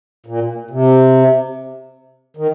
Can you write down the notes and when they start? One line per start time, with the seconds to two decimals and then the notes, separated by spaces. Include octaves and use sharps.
0.26 A#2
0.70 C3
2.37 D#3